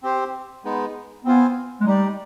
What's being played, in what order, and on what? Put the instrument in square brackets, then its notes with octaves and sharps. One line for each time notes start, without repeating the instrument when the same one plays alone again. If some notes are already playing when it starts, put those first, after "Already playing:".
[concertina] C4 G4 C5
G#3 B3 D#4
[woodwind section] B3 [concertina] C4 F4 C5 F5 G#5
[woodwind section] G#3
[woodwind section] G3 [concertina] D#4 G4 D5